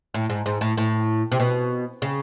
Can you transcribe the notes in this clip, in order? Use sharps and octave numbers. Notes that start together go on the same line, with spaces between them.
A2
G#2
G#2
A2
A2
C3
B2
C#3